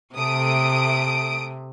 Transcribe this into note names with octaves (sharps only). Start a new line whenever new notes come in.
C3 A3 D#6 D7